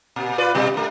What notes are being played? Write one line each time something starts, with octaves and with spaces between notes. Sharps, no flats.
A#2
F4 B4 D5
G2 B2 G3
G2 A3